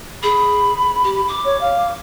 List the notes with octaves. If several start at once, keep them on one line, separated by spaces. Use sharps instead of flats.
G#4 B5
G4
D6
C#5
F5